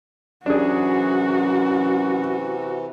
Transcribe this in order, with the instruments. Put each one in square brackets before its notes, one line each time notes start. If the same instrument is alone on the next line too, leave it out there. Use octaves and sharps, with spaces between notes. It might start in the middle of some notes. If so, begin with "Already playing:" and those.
[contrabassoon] F#2 [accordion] C3 E3 [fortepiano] D4 G#4 [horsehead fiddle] F#4